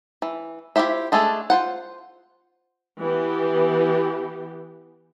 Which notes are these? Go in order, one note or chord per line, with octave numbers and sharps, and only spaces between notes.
E3
E4 F4 G4 C5 E5
G#3 A3 D4 G#4 A4
F4 C5 F#5
E3 B3 G4